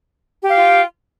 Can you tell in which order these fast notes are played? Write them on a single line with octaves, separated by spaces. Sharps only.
G4 F5 G5 F4